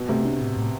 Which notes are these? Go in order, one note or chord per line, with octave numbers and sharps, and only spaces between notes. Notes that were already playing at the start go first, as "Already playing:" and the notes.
Already playing: B2
C3 A3
D4
A2
A2